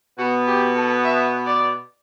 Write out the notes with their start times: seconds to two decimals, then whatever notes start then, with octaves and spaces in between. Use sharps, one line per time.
0.19 B2 B3 F#4
0.48 G4
0.76 A4
1.04 E5
1.47 D5